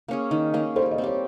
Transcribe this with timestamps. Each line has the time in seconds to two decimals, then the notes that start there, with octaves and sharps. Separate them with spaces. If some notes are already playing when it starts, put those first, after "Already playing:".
0.08 A#3 C#4 G#4
0.31 D#3
0.54 A#3 C#4 G#4
0.76 G3 C5
0.91 D#5
0.98 C4
1.04 G4 C#5